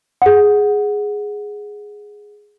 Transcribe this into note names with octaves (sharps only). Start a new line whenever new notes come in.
G#4 F#5